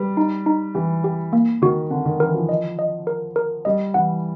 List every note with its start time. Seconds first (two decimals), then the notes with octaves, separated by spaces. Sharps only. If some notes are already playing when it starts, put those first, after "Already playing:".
Already playing: G3 B4
0.17 D#4
0.46 D#4
0.75 E3 G4
1.04 G4
1.33 A#3
1.62 D#3 F#4
1.91 D3 C4
2.06 D#3
2.20 E3 A#4
2.34 F3
2.49 D#5
2.79 D#5
3.07 A#4
3.36 A#4
3.65 G3 D#5
3.94 E3 F#5